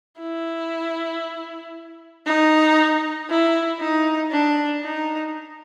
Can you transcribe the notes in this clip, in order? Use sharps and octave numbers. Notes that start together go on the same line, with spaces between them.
E4
D#4
E4
D#4
D4
D#4